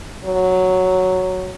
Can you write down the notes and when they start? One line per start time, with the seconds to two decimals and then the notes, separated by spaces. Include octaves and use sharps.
0.24 F#3